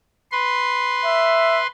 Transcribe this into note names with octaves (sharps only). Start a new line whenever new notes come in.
B4 C6
E5